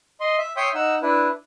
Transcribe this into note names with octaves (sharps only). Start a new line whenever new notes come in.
D#5 C6
E5
C#5 E5 G5 C6 D#6
D#4 F#5 E6
D4 E4 B4